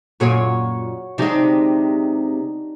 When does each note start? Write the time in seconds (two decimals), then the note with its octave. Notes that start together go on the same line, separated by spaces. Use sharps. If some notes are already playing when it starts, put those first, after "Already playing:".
0.20 F#2 A#2 F#4 G#4 C#5
1.18 C3 G#3 D4 D#4 G4